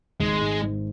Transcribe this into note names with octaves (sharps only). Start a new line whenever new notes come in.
G#1 G#3
G#2
G#2